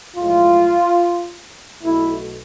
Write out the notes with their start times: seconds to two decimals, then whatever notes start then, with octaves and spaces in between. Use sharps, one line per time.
0.17 B1 A2 F3 G#3 F4
1.83 B1 B2 A3 E4